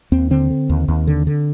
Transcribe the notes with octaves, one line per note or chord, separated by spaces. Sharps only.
D#2 C4
D3 C4
D3
D#2
D#2
D3
D3